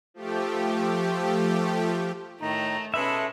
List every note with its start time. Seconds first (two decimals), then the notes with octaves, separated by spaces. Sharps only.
0.14 F3 A3 G4
2.41 A2 D#3 A3 D#4 A#5
2.94 B2 G#3 C#4 A4 B4 E5 B5